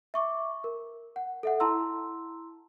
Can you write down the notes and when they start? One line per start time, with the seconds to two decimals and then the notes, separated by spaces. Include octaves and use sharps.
0.14 E5 C#6 D6
0.64 A#4
1.16 F#5
1.43 A4 E5 F#5
1.60 E4 A5 A#5 C6 E6